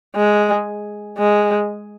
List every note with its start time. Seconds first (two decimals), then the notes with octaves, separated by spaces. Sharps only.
0.16 G#3
1.18 G#3